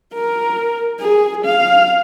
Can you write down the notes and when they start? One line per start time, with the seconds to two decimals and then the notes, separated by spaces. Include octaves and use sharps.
0.14 A#4
1.00 G#4
1.45 F5